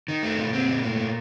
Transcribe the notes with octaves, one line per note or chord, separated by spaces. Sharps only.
D#3
A3
A#2
C4
A#2
A3
A#2